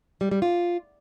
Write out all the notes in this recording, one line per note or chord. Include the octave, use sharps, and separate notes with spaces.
G3
G3
F4